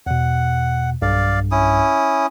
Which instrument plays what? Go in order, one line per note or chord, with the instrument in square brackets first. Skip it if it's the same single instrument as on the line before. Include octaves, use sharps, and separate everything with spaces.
[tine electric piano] E2 B2 [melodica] F#5
[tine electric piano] B1 G2 [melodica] D5 F5
[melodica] C#4 E4 D#6